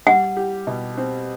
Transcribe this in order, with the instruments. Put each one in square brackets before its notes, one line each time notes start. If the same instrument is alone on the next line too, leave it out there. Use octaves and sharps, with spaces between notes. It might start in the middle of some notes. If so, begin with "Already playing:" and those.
[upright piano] G3 [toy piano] F#5
[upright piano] G4
B2
C4